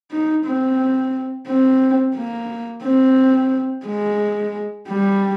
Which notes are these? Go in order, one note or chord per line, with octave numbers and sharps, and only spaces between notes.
D#4
C4
C4
A#3
C4
G#3
G3